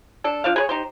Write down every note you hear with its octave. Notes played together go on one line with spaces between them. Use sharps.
D4 A4
F3 D4 F5
G#4 B4 C#5
D#4 G4 C5